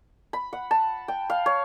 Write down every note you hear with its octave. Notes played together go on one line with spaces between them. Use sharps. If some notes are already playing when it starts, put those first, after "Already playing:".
B5
F#5
A5
G5
F5
C#5